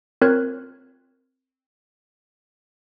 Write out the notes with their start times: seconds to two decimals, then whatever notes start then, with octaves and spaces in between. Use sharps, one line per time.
0.22 C4 F4 A#4 C#5 F#6 G#6